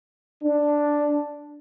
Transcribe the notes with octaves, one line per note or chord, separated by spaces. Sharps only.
D4